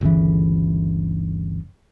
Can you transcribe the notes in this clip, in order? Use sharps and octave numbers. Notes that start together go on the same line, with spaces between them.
G1 D2 C#3 E3